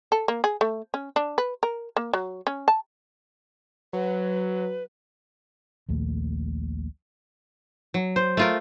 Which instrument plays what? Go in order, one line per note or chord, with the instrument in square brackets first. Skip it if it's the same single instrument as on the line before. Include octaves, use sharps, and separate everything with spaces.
[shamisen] A4
A#3
G#4
A3
C#4
D4
B4
A#4
A#3
F#3
C#4
A5
[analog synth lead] F#3 [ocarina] B4
[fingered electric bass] A#1 D#2 A#2 A3
[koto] F#3
C5
A3 F4 A#4